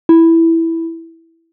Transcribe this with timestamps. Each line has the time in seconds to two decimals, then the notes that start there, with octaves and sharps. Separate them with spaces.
0.09 E4